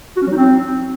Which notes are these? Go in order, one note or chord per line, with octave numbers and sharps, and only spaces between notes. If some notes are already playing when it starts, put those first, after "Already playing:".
F#4
C#4
F#3
D#4
C4